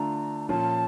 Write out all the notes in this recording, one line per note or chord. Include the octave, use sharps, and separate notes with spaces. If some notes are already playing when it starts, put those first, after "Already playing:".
Already playing: D3 A3 D4 F4 A#5
A#2 F3 C#4 F4 A5